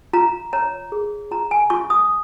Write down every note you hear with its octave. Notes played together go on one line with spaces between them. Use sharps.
F4 A#5
C#5 A#5
G#4
F4 A#5
G#5
F4 C#6
D#6